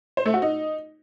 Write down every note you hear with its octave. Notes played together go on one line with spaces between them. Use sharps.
C5
A3
F#4
D#4